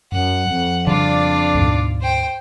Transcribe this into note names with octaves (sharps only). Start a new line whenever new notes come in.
F#2 F#5
F2
C#3 G3 D4 F4 D5
D2 G#2 B2
C5 G5